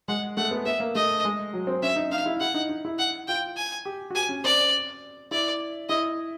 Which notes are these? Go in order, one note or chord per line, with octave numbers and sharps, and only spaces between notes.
G#3 F#5
A3 F#5
B3
B3 E5
A#3
A3 D#5
G#3
F#3
C4
C#4 E5
D#4
D#4 F5
E4
E4 F#5
D#4
D#4
E4
F#5
F4 G5
G#5
G4
F#4
G4 G#5
C#4
C4 D5
E4 D5
E4 D#5